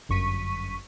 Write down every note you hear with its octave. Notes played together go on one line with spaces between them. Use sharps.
G1 F#2 C#6 B6 D#7